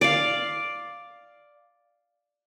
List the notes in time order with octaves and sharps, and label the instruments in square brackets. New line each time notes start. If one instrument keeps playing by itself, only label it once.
[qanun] D5 F5